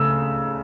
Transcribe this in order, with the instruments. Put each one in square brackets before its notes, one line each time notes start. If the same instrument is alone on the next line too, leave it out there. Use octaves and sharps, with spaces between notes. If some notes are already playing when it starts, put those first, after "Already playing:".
Already playing: [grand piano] C#3 A3 E6